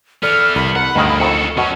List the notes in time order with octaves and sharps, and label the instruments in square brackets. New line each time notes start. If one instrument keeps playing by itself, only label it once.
[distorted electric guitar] E3 B3 [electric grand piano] A4 D5 [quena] F6
[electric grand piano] C2 B6 [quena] B5
[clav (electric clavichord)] A#4 [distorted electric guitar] F#5
[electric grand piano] D2 F6 [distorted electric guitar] G2 A#3 [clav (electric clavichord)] B2 D#3 G#3
[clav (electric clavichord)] F2 D#3 [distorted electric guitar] F#4 A4
[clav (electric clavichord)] B2 [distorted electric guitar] F#3 C#4 [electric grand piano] C#6